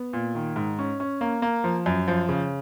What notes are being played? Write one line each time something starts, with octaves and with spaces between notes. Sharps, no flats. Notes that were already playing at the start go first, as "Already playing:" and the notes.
Already playing: B3
A#2
D#3
G#2
C#4
C#4
A#3
A#3
F3
F#2
F3
C#3